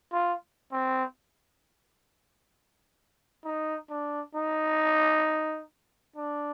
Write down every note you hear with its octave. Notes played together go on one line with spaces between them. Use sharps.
F4
C4
D#4
D4
D#4
D4